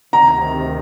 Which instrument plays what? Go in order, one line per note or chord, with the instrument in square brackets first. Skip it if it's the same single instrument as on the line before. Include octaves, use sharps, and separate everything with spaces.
[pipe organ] D2 C3 D#3 [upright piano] A#5